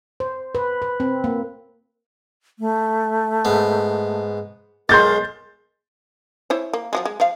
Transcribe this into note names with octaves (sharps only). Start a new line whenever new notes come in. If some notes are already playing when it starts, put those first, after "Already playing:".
C5
B4
B4
C4
A#3
A3
G#2 B3
B1 G#3 A#4 C6 G6 A6
E4 C5 C#5
A#3
F3 F#3 G#3
G#3
F3 F5